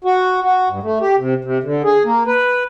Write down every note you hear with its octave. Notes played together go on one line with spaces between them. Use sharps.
F#4
F#4
G2
A3
G4
C3
C3
D3
G#4
A#3
B4